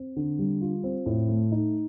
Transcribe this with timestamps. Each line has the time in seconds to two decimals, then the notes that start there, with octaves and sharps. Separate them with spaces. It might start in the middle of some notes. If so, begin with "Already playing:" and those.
Already playing: C4
0.16 D3
0.39 G3
0.61 F4
0.84 C4
1.06 A2
1.29 A3
1.52 D#4